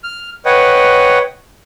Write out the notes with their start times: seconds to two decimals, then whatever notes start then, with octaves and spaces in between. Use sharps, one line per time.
0.04 F6
0.46 B4 C#5 D#5 F#5 G5